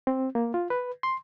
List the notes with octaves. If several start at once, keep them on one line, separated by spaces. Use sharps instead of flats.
C4
A#3
F4
B4
C6